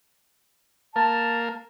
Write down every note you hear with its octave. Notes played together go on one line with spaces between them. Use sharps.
A#3 A#4 F5 A5